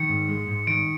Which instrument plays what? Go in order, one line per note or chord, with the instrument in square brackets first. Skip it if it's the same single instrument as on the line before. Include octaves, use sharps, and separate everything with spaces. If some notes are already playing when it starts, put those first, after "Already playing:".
Already playing: [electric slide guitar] D#3 [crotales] C#7
[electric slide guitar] G#2
G#3
G#2
[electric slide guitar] D#3 [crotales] D7